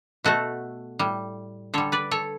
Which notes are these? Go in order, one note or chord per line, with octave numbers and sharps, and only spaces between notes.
B2 A3 F#4 A4
A2 G3
D3 G3 A4 C#5
B4 D5
A4 C#5